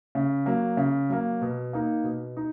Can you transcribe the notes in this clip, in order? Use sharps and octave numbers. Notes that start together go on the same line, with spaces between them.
C#3
F#3 A#3
C#3
F#3 A#3
B2
A#3 D#4
B2
D#4